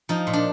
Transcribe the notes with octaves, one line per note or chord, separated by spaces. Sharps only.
F3 D#4
A#2
D4